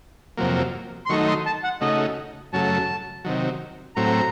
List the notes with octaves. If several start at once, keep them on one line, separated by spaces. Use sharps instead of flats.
F2 C3 F#3 A#3
C6
D#3 F#3 A3 D#4 C#6
C6
A5
F#5
C#3 A3 D#4 F#4 D#5
F#2 C#3 F#3 A3 A5
C3 D#3 F#3
A2 F#3 C4 A#5